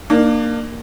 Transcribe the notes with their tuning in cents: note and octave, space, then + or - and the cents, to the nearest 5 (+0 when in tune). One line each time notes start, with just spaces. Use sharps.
A#3 +0 D4 +35